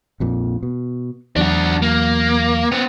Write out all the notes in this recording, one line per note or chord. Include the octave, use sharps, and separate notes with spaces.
A#1 F2 A#2
B2
E2 F#3 D4 F#4
A#3
B3 C4